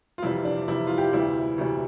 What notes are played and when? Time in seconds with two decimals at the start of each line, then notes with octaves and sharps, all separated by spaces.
0.18 F4
0.23 F2 C3 E3 G3 E4
0.45 D4
0.68 F2 C3 E3 G3 E4
0.87 F4
0.98 G4
1.13 D2 C3 E3 G3 E4
1.58 D2 C3 E3 G3